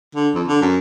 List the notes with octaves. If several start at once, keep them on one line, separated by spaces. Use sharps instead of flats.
D3
F2
D3
F#2